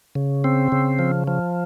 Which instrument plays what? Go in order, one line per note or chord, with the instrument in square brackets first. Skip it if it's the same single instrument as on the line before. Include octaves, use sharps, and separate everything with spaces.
[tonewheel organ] C#3
C4
C#3
F3
F3